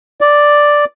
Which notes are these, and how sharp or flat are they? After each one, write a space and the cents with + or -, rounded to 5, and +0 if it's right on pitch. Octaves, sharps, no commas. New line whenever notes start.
D5 +0